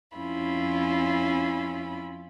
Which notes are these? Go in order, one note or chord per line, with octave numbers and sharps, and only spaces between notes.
F2 C#4 E4 F4 B5